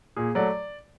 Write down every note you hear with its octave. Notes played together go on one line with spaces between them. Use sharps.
A#2 G#4
F#3 A3 D5